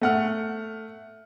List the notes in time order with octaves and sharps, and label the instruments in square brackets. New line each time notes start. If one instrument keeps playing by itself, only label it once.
[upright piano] A3 F#5 F6